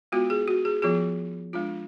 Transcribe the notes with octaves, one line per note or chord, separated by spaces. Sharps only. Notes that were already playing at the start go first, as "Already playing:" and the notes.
G#3 B3 F4 F#4
G#4
F#4
G#4
F3 B3 F4 G#4
G#3 D4 F4